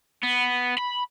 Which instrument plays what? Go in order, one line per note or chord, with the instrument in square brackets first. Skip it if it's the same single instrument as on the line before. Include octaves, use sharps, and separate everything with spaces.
[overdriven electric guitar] B3
B5